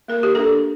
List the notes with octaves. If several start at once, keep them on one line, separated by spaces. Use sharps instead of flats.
A#3 A#4
G4
D4 A4